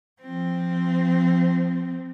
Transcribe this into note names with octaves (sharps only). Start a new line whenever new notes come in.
F3 C4